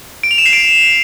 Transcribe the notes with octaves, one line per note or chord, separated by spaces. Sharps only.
D7
F7
E7
C7
D7